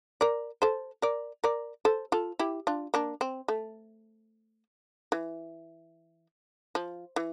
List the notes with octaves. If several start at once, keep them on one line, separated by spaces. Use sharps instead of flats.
A#4 D5
A4 C5
A#4 D5
A#4 D5
A4 C5
F4 A4
E4 G4
D4 F4
A#3 D4
C4
A3
E3
F3
E3